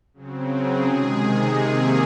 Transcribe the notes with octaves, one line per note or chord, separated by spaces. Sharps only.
C#3 F#3 C4
G#4
C3 D#3 G#3
G#4
C3 D#3 A#3